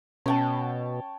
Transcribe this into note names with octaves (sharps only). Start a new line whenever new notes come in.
B2 C#4 C#5 G5 A5